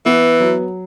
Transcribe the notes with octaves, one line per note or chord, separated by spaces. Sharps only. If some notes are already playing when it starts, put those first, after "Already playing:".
E3 B3
F#3